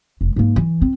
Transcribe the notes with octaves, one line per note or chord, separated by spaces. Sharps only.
F1
G#2 A#3
E3
C4